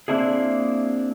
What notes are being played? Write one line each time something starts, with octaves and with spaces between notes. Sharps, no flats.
A#3 C4 D4 E4 G#4